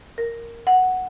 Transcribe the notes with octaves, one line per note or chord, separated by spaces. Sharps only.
A#4
F#5